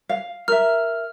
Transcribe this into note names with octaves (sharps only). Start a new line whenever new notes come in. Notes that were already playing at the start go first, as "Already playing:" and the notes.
F5
A#4 E5 F6